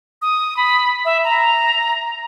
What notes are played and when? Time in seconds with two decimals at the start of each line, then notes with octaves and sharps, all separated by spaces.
0.22 D#6
0.57 B5
1.05 E5
1.24 A#5